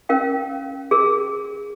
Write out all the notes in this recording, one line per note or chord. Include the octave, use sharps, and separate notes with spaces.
C#4 A#4 F5 G5
G#4 A#4